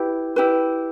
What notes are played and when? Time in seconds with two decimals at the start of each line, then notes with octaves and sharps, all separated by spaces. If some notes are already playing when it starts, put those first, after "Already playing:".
Already playing: E4 G4 B4
0.36 E4 G4 B4